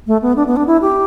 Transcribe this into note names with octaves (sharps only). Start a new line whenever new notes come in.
A3
B3
D4
B3
D4
E4
G4